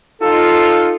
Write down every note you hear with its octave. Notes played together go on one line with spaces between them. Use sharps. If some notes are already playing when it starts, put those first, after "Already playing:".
D#4 F4 A4